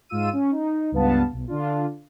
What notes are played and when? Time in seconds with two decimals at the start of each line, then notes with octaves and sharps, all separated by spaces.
0.09 G#2 F4 E6 D#7
0.33 C#4
0.51 D#4
0.92 C#2 G2 B3 F5 A5
1.32 B1
1.47 D3 D4 F4